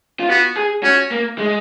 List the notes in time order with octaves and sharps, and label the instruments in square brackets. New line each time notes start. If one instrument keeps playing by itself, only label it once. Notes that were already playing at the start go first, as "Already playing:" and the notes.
[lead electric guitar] F4
[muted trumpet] B3 [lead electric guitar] F#4
[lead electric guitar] G#4
[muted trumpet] C#4 [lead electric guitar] F#4
[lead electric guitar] A#3
G#3